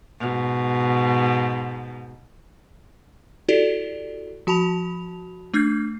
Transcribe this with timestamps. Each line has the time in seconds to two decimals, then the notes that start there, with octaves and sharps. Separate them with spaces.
0.19 G#2 B2
3.48 E4 F#4 G4 A4 D5
4.47 F3 F#4 A5 B5 F7
5.54 A3 D4 F6 G6 G#6 C7